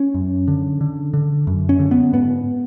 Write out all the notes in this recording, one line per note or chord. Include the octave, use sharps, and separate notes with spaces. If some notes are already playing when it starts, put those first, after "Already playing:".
Already playing: C#4
F#2
D3
D3
D3
F#2
C#4
D3
B3
G#2 B3